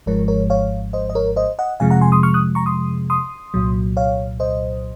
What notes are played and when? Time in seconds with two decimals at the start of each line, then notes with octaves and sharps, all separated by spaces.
0.06 G#1 G#2 F3 G#3 A#4 C#5
0.28 A#4 C#5
0.50 C#5 F5
0.93 C5 D#5
1.09 D#5
1.15 A#4 C#5
1.36 C5 D#5
1.59 D#5 F#5
1.80 F2 C3 F3 G#3 F5 G#5
1.90 F#5 A#5
2.01 G#5 C6
2.12 C6 D#6
2.23 C#6 F6
2.34 D#6 F#6
2.55 A#5 C#6
2.66 C6 D#6
3.10 C6 D#6
3.54 C2 A#2 F#3
3.97 C#5 F5
4.40 C5 D#5